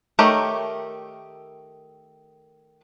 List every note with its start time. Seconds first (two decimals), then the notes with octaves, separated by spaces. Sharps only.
0.19 D#3 A3 G4 A#4 C#5